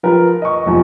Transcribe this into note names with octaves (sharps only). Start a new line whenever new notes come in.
F3 A#4 B4
D#5 C#6
F1 E2 F3